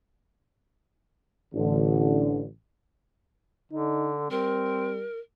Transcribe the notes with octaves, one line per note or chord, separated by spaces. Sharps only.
A1 D3
D3 D#4
G3 C4 A#4